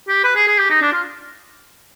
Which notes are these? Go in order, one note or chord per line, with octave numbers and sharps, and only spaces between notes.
G4
B4
G#4
G#4
G4
D#4
D4
F4